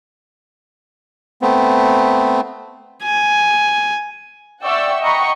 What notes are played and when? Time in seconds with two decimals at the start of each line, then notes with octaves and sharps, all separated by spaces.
1.42 A3 B3 C4
3.03 G#5
4.63 D5 E5 F#5 G5 C#6 E6
5.02 D#5 F#5 G5 A#5 B5 C#6